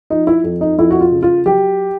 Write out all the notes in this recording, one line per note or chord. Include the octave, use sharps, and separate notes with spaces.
F3 D#4
E4
F2
D#4
F2 E4
F#4
F4
C#3
F4
F#3 G4